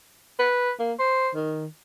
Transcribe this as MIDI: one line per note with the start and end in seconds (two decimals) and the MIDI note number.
0.39 0.72 71
0.79 0.93 58
0.99 1.30 72
1.35 1.66 51